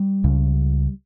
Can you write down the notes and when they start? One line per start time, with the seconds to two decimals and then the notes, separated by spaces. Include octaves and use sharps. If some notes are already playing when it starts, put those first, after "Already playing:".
Already playing: G3
0.24 C#2 C#3